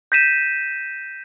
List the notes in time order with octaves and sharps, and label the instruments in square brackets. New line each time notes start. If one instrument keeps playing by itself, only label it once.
[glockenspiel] G6 A#6 B6 D#7 E7